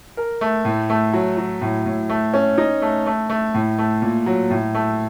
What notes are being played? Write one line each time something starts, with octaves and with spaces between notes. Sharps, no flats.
A#4
A3
A2
A3
F#3
F#3
A2
A2
A3
C#4
D#4
A3
A3
A3
A2
A3
A#2
F#3
A2
A3